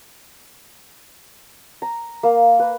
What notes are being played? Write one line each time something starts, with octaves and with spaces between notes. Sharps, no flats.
A#5
A#3
B4